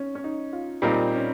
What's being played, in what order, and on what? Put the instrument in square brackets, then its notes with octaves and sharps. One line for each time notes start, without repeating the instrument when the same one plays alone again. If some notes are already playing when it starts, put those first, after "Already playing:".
Already playing: [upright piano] C#4 D#4
C#4
D#4
F4
[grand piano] A#2 G3 C4 D#4 A#4 [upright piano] F4
[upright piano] C#4